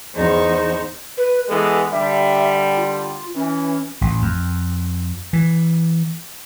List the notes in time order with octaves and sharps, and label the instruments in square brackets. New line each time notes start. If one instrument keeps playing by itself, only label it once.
[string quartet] E2 D#4 G#4 C5 C#6
[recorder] B4
[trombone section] E3 G#3 B3 [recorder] A4
[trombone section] D3 G3 [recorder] E5
[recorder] F4
[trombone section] E3 [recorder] C#4
[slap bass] A1
F2
E3